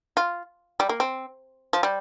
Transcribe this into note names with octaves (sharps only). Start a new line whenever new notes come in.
F4
G3
A#3
C4
F3
G3